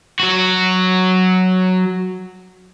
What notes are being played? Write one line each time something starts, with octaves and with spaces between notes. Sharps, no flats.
F#3 F#4